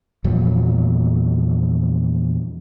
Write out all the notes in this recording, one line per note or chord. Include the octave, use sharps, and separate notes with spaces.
E2 A#2 F3 F#3